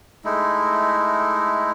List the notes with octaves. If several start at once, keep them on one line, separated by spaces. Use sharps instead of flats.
G#3 A3 D#4 E4